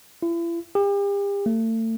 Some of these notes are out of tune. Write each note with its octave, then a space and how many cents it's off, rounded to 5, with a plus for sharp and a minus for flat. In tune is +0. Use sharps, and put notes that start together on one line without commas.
E4 +40
G4 +40
A3 +35